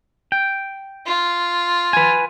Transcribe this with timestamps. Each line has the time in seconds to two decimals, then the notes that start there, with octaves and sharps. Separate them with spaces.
0.32 G5
1.07 F4
1.93 B4 G#5